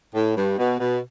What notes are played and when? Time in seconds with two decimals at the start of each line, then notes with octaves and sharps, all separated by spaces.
0.15 A2
0.36 G2
0.58 B2
0.79 B2